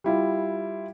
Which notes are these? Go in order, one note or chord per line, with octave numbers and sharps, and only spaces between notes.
G3 E4 F4